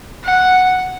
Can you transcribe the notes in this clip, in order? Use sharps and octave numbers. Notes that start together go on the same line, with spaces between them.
F#5